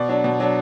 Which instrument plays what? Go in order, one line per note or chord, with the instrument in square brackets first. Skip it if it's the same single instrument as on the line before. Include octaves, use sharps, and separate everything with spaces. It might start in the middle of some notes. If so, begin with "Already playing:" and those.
Already playing: [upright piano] B2 D5
F#3 D4
B2
F#3 D4